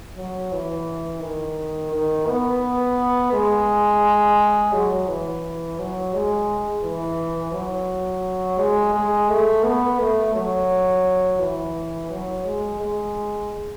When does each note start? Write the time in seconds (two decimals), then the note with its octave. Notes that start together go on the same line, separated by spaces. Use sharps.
0.17 F#3
0.52 E3
1.21 D#3
1.92 D#3
2.28 B3
3.33 G#3
4.73 F#3
5.07 E3
5.79 F#3
6.14 G#3
6.83 E3
7.53 F#3
8.59 G#3
8.94 G#3
9.29 A3
9.64 B3
9.99 A3
10.35 F#3
11.40 E3
12.11 F#3
12.45 G#3
12.80 G#3